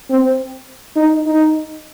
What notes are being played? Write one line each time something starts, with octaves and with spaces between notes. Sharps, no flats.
C4
D#4
D#4